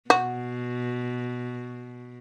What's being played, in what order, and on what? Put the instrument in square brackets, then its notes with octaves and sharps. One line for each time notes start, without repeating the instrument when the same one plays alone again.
[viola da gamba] B2 [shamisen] F#4